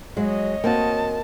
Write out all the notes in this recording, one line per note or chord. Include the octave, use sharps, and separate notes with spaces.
F#3 G#3 C#5 D#5
A#3 C4 F#4 A5